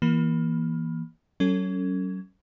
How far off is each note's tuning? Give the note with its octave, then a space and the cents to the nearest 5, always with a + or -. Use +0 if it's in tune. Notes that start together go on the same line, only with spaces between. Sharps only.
E3 +0 A#3 +20
F#3 +35 C#4 +0 A4 +25